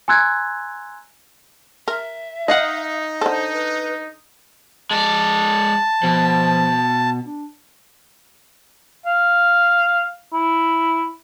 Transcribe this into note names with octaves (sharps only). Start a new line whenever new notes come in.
G#5 A#5 C6 E6 F#6 G#6
A#4 E5
D#4 D#5 F5 F#5
D3 A4 C5
B4
G#3 D5 A5
B2 F3
D4
F5
E4